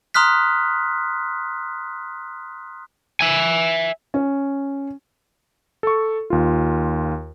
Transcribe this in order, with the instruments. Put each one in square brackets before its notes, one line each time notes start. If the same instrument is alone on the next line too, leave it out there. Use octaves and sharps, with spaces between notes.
[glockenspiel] A#5 C6 D#6 F6 F#6 B6
[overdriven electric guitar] E5 G#5
[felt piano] C#4
[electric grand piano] A4 C#6
D#2 F4